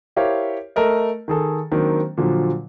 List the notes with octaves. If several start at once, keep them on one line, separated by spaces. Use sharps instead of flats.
E4 G4 A#4 C5 C#5 F5
A3 A4 A#4 D#5
D#3 G#4 A4
D#3 F#3 A#3 C4 D4
A#2 D3 F3 F#3